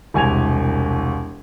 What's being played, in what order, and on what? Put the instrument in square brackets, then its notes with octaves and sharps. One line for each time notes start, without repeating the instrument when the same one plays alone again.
[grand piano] E1 C2 G#5 G#6 F7